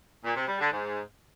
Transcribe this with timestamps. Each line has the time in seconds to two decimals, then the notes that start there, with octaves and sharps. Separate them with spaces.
0.25 A#2
0.37 C3
0.48 G3
0.60 D3
0.72 G#2